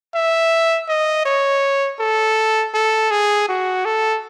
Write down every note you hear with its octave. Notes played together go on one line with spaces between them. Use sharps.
E5
D#5
C#5
A4
A4
G#4
F#4
A4